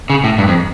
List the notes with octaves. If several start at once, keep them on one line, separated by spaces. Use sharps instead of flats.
C#3
A2
G2
F2